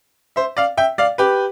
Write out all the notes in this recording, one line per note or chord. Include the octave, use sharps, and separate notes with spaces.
C5 E5
D5 F5
E5 G5
D5 F5
G4 B4